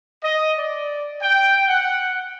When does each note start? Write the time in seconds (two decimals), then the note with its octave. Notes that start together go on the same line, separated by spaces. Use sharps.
0.23 D#5
0.58 D5
1.22 G5
1.69 F#5